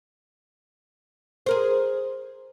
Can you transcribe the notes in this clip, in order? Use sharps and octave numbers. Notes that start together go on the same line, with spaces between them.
G#4 A#4 C5